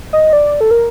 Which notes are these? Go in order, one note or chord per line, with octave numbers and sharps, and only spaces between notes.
D#5
D5
A4
A#4